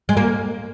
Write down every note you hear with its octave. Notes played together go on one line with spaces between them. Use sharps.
G#3
A#3